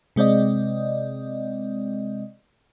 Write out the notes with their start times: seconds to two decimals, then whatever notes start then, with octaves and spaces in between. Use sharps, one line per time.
0.16 C3 G#3 C4 D5 D#5